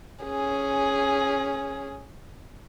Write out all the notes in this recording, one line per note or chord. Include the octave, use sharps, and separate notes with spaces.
C#4 G#4